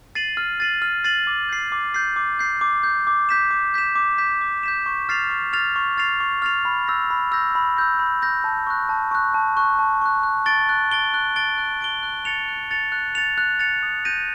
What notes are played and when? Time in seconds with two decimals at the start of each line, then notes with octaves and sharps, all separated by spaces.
0.15 A6 C7 D#7 F#7
0.37 F6
0.60 A6 C7 D#7 F#7
0.82 F6
1.04 A6 C7 D#7 F#7
1.27 D6
1.49 G6 C7
1.72 D6
1.94 G6 C7
2.16 D6
2.39 G6 C7
2.61 D6
2.83 G6 C7
3.07 D6
3.29 G6 B6 E7
3.51 D6
3.74 G6 B6 E7
3.96 D6
4.18 G6 B6 E7
4.41 D6
4.63 G6 B6 E7
4.86 C#6
5.09 F6 A6 C7 F7
5.30 C#6
5.53 F6 A6 C7 F7
5.76 C#6
5.97 F6 A6 C7 F7
6.20 C#6
6.42 F6 A6 C7 F7
6.65 B5
6.87 E6 G6 A#6
7.10 B5
7.32 E6 G6 A#6
7.55 B5
7.77 E6 G6 A#6
7.99 B5
8.22 E6 G6 A#6
8.44 A5
8.67 C#6 F#6
8.89 A5
9.11 C#6 F#6
9.34 A5
9.57 C#6 F#6
9.79 A5
10.02 C#6 F#6
10.23 F#6
10.46 A6 D7 G7
10.69 F#6
10.92 A6 D7 G7
11.14 F#6
11.36 A6 D7 G7
11.58 F#6
11.81 A6 D7 G7
12.03 F#6
12.25 A6 C#7 F7
12.48 F#6
12.71 A6 C#7 F7
12.92 F#6
13.15 A6 C#7 F7
13.38 F#6
13.59 A6 C#7 F7
13.83 D#6
14.05 G6 A#6 D#7